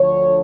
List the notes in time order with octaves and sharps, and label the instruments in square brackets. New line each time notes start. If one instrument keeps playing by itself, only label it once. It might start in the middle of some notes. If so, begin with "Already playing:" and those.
Already playing: [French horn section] D2 D3 F3 C#5